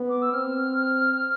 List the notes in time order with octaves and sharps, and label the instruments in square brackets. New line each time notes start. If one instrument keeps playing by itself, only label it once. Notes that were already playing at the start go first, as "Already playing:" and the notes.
Already playing: [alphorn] B3
[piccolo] D6
E6
[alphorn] C4 [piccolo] F6